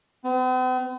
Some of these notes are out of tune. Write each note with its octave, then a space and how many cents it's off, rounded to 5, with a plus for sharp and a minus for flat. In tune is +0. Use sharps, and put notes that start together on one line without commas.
C4 -45